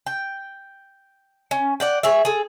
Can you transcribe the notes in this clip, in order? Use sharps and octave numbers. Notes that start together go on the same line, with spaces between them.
G5
C#4
D5 F#5 G5
G#4 C#5 E5
G#4 A4